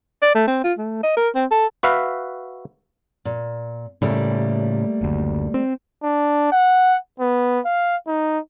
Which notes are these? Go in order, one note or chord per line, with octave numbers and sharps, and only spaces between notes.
D5
A3
C4
F4
A3
D#5
A#4
C4
A4
F#4 B4 E5 F5
A#2
A2 C#3 G3 A3 A#3
F#1 D2
C4
D4
F#5
B3
F5
D#4